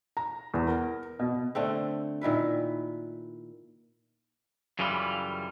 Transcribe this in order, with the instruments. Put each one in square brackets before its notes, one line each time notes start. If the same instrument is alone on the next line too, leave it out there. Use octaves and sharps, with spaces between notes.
[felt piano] A#5
E2
A#4
B2
[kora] D3 A3 C4
A#2 D#3 E4 B4
[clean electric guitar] F#2 C#3 E3 G3 F4